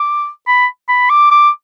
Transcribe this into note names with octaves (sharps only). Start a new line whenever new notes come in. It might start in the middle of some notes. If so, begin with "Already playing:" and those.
Already playing: D6
B5
B5
D6
D6